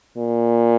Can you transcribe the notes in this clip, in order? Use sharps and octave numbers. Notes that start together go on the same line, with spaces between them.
A#2